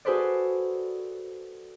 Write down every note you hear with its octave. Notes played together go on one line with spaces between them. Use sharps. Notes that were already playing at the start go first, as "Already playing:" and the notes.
F#4 G#4 A4 B4 C5 D5